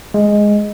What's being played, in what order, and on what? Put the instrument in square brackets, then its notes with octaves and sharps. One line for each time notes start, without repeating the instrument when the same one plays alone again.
[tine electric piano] G#3